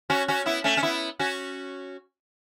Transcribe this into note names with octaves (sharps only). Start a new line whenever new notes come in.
C#4 F#4
C#4 F#4
B3 E4
A3 C#4
C#4
B3 E4
C#4 F#4